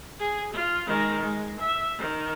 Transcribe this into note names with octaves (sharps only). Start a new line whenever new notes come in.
G#4
F4
D#3 G#3
G#3
E5
D#3